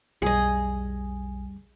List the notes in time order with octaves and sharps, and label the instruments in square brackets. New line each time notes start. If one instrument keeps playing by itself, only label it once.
[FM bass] B1 [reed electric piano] F2 G3 [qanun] G#4 D#5